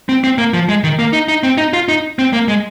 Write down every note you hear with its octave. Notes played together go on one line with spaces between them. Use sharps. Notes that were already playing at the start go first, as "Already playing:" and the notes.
C4
C4
A#3
F3
G#3
D#3
A#3
D#4
D#4
C4
D#4
F4
D#4
C4
A#3
G#3